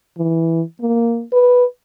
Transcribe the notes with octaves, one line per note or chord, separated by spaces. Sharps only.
E3
A#3
B4